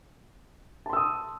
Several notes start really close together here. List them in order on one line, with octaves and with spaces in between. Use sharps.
A5 C6 E6 D#6